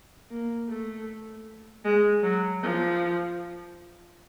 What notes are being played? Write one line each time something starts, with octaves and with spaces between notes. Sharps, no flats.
A#3
A3
G#3
F#3
F3